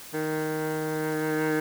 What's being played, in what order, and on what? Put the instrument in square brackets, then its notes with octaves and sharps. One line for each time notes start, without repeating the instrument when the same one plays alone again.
[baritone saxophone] D#3